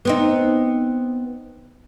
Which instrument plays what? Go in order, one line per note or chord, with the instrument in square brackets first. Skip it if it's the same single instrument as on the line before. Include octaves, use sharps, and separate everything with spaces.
[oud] B3 C4 D#4